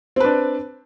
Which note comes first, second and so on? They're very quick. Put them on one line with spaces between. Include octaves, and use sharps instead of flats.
C4 B4 D4